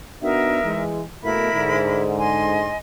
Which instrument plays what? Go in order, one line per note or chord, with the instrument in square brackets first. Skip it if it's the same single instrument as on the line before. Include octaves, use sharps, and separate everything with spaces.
[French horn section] B3 D4 F#4 [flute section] D#4 A#4 E5
[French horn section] E3 G#3
[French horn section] B2 A3 A#3 [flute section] E4 A#4 B5
[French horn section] G#2 D3
[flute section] D#5 G#5 C6